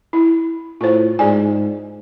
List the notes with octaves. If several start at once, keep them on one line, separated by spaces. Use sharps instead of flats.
E4
A2 F4 C5
G#2 G#4 D5 G#5